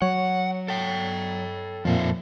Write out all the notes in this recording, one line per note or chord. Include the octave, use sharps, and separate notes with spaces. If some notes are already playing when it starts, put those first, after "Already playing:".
F#3 C#5 F#5
A4 G5
F2 A#2 F3 C5 E5